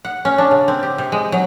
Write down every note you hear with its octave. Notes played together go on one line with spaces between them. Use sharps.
F#5
C#4
D4
C#3
C4
G4
C3
G#3
F#3